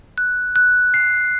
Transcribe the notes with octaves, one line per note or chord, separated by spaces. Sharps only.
F#6
F#6
C7